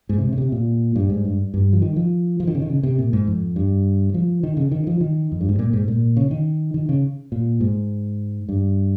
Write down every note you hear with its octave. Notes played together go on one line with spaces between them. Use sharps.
G#2
C3
C#3
C3
A#2
G2
G#2
G2
G2
F3
D#3
F3
F3
D#3
C#3
D#3
C#3
C3
A#2
G#2
F2
G2
F3
D#3
C#3
D#3
F3
D#3
F2
G2
G#2
A#2
G#2
A#2
C#3
D#3
D#3
C#3
A#2
G#2
G2